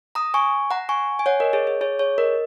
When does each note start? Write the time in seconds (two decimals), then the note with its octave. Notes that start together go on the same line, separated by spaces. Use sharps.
0.15 A#5 D#6
0.34 G#5 C#6
0.71 F#5 A#5
0.89 G#5 C#6
1.19 G#5
1.26 C#5 F#5
1.40 A#4 D#5
1.53 G#4 C#5
1.67 G#4
1.81 G#4 C#5
1.99 G#4 C#5
2.18 A#4 D#5